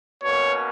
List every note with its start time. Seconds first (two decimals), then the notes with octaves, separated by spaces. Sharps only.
0.23 B2 A#3 C#4 C#5